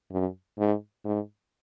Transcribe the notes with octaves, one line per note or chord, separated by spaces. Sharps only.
F#2
G#2
G#2